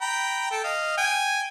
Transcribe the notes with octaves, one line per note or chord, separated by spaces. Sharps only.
G5 A#5 B5
A4 G5
D#5 F5
G5 G#5